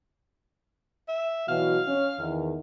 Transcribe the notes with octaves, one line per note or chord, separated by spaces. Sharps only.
E5
B2 E3 F#3 F5
C#4
E2 D#3